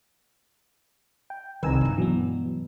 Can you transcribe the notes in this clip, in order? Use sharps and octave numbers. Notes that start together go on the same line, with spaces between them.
G5
C2 D#3 B4 G#5 A#5 E6 E7
G2 G#3
B2 E3 F#3 B3